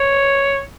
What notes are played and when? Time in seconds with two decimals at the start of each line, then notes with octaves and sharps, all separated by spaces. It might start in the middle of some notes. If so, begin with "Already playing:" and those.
Already playing: C#5